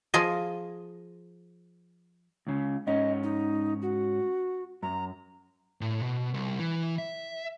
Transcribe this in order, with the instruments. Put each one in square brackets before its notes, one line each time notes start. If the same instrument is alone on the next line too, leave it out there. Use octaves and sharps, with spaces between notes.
[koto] F3 F4 G#4 D#5
[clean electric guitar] C#2 C#3
[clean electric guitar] G#2 C#4 [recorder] D#5
[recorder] D#4
F#4
[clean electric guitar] F#2 [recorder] A#5
[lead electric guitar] A2
B2
C2
E3
E5